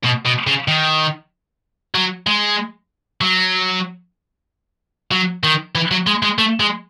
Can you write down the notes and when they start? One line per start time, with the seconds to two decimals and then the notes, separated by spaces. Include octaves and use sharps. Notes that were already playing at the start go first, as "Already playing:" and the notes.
0.05 B2
0.26 B2
0.47 C#3
0.68 D#3
1.95 F#3
2.27 G#3
3.21 F#3
5.11 F#3
5.43 D#3
5.75 E3
5.91 F#3
6.07 G#3
6.23 G#3
6.38 A3
6.60 G#3